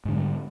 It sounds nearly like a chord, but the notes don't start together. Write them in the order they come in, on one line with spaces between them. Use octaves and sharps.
G#2 D3 F#3 G3